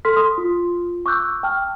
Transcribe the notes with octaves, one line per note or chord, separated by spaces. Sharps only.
A4 C6 F6 B6
C6 D#6
F4
C#6 D6 E6 F#6 G6
G5 A5 F6